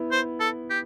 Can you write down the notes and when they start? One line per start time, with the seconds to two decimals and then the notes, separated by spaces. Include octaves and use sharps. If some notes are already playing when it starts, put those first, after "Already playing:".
Already playing: B3 E4
0.11 C5
0.40 A4
0.70 G4